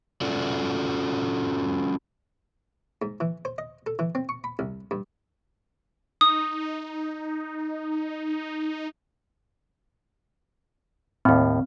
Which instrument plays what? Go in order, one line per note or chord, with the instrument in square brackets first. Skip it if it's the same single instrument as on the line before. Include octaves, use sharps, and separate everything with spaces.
[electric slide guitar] C#4 F4 F#4 A4 D5
[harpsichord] G#2
E3
C5
D#5
A4
E3
C4
C#6
B5
C2
G2
[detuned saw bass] D#4 [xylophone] D#6
[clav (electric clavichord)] D#2 A2 [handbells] C4